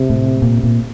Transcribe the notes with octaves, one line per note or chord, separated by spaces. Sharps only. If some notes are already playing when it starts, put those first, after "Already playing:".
Already playing: C3
A2
A#2
A#2